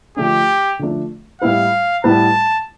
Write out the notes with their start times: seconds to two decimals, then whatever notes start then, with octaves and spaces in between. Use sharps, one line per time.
0.17 D3 F3 A3 D4 G4
0.79 D3 F3 A3 D4
1.41 A2 G3 B3 E4 B4 F5
2.04 A2 G3 B3 E4 B4 A5